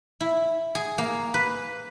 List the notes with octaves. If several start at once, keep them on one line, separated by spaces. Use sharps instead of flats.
E4
G#4
A#3
B4